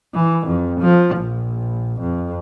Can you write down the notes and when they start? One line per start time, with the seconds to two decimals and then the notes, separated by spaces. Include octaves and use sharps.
0.14 E3
0.47 F2
0.80 F3
1.17 A#1
2.00 F2